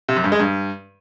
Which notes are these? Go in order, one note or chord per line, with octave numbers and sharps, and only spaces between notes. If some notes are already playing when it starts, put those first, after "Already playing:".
C3
F#2
G2
G#3
G2